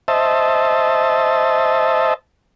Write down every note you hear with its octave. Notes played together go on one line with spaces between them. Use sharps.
C5 D#5 E5 A5